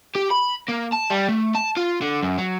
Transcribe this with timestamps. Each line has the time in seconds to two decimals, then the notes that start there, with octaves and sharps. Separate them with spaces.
0.15 G4
0.30 B5
0.68 A#3
0.92 A5
1.10 G3
1.29 A3
1.55 A5
1.77 F4
2.02 D3
2.23 F#2
2.38 F#3